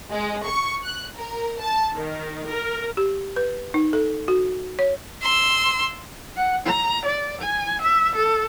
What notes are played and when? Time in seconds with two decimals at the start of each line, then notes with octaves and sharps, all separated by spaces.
0.12 G#3
0.46 C#6
0.84 F#6
1.16 A#4
1.59 A5
1.96 D#3
2.50 A#4
2.97 G4
3.36 B4
3.74 D#4
3.93 A4
4.28 F#4
4.79 C#5
5.23 C6 E6
6.36 F#5
6.66 A#5
7.05 D5
7.41 G#5
7.82 E5
8.15 A4